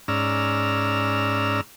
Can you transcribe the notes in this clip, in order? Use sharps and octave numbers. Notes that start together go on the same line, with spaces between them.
G#2 C#4 D5 A#5 E6 F6